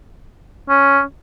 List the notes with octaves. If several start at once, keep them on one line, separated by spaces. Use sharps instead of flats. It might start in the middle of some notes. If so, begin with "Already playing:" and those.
C#4